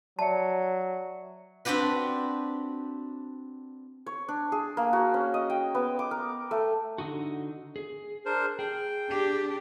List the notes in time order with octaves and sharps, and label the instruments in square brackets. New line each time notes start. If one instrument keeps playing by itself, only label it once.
[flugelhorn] F#3 [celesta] D5 E5 C#7 [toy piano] A5
[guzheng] C4 D4 F#4 G4 B4
[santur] C#5
D4
G#4
A#3
F#4
C#4
D#5
G5
B3
D6
A#4
A3
[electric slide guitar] D3 D#4 F#4
G#4
[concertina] D4 A#4 C5
[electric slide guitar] G#4 [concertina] G5
[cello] D4 G4